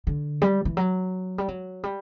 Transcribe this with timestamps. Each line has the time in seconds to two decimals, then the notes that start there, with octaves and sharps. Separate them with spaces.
0.07 D3
0.42 G3
0.65 E3
0.77 F#3
1.38 G3
1.48 F#3
1.83 G3